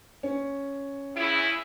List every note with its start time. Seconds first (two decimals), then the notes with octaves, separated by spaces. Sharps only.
0.23 C#4
1.15 E2 C#3 E4